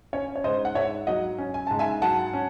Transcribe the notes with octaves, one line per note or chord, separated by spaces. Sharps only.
C#4 C#5
C#5
G#2 C5 D#5
F#5
G#2 C#5 E5
F#3 D#5 F#5
C#4
G#5
G#2 A5
E5 G#5
F#3 F#5 A5
C#4